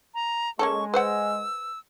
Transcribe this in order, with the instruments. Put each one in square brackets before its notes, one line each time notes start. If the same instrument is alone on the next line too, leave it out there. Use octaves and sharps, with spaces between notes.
[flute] A#5
[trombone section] G#3 [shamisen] A#3 C#4 A4 [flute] C#6
[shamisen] B4 C5 F#5 [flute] E6